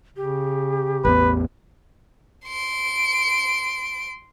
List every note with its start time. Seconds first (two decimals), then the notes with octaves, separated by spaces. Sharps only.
0.16 C#3 G4
1.05 A1 E2 B3 B4
2.47 C6 D7